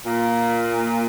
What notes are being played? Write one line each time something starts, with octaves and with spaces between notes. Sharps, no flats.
A#2